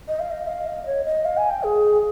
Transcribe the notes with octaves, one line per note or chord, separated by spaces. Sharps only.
D#5
F5
D#5
F5
D#5
C#5
D#5
F5
G#5
G5
G#4